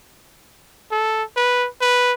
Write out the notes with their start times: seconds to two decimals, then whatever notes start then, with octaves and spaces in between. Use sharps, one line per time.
0.91 A4
1.36 B4
1.81 B4